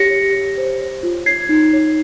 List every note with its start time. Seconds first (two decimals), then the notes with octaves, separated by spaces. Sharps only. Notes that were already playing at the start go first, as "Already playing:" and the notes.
Already playing: G4 C#5 A#6 C#7
0.10 C#5
0.35 G4
0.58 C5
0.80 C#5
1.03 F4
1.26 C#5 G#6 C7
1.49 D#4
1.73 C#5